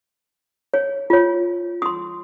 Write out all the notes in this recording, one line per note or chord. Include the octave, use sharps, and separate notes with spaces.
C#5
F4 C#5
C6 D#6